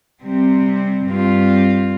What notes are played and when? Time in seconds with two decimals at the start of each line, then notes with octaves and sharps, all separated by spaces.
0.23 C3 G3 C4
1.06 G2 G3 C4 F4